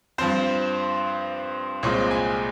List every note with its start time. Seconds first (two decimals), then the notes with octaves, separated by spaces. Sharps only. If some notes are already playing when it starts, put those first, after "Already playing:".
0.18 G2 F3 C4 C5
1.83 C2 A#2 G#3 C4 C#5
2.11 G#5